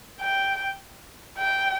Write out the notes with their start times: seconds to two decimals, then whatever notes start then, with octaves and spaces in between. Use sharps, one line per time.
0.20 G5
1.38 G5